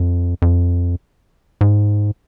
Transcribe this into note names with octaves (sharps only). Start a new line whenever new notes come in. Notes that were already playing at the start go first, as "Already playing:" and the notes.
Already playing: F2
F2
G#2